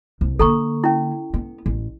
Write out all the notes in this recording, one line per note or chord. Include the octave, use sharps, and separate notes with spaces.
C2
D3 A#3 A4 A#5 C#6
C#4 E4
B3
A1